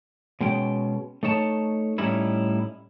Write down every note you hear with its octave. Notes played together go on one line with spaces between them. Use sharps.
B2 G#3 C#4 G5
A3 D#4 C#5 A5
A2 G3 C#4 D#4 E4